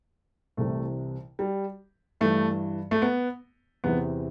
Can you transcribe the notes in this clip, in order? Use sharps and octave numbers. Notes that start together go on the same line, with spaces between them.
C2 C3 E3 A3
G3
G2 E3 A3
A3
B3
E2 C3 E3 B3